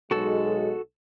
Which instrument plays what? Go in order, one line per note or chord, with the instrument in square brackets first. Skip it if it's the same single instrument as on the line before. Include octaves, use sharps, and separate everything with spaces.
[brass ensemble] B1 G#3 [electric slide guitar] F#4 A4